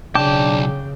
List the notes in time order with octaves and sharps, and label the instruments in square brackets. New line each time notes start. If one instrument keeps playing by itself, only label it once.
[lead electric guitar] B1 A5 [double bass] C#3 [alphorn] D4 [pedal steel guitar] G5 D6